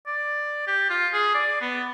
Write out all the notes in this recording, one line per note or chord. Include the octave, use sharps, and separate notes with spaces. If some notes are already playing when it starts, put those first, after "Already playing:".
D5
G4
F4
G#4
D5
B3